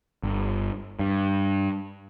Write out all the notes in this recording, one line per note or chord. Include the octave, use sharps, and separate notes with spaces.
G1
G2